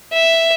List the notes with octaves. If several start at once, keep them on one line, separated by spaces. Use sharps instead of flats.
E5